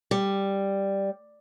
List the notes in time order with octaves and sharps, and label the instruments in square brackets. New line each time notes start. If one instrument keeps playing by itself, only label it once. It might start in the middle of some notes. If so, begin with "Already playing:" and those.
[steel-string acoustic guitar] G3